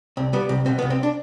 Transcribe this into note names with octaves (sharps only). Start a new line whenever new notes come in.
C2 C4
G3 B3
C2 C4
B2 C4
B3
C2
C4
D4